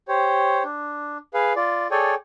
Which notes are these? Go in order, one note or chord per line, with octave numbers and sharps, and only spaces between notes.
G4 C5 C#5
D4
G#4 B4 F5
F4 D5
G#4 A4 C#5 D5 G5 G#5